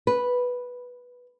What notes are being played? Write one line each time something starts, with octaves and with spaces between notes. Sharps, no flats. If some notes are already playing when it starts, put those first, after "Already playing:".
B4